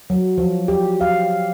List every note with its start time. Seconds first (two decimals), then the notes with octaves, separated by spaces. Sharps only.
0.10 F#3
0.38 F3
0.68 G4
1.01 F5